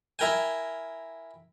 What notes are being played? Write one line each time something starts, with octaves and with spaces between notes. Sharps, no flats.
E4 A#4 G5 G#5